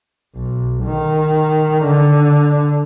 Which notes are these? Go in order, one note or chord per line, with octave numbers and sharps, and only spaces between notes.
B1
D#3
D3